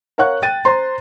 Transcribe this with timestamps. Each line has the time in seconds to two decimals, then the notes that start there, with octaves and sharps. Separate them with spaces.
0.18 A#4 C#5 F5 F#5 C#6 F#6
0.42 G5 A6 D#7
0.65 C5 A#5 C6